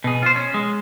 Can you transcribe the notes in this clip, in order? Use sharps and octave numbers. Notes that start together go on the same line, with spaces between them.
B2 G#4
F4 C5
C#4
G#3